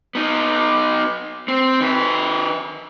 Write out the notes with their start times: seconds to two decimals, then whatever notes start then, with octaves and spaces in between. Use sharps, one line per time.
0.15 B3 D#4
1.48 C4
1.81 D#3 B4